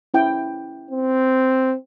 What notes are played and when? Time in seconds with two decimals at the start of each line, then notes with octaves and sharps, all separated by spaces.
0.14 C#4 E4 G5
0.91 C4